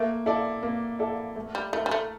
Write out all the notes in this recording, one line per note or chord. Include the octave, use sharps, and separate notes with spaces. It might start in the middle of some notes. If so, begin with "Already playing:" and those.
Already playing: A3 A#3
E4 A4 D5
A#3
E4 A4 D5
A3
G3
A3 E4 A#4
G3
A3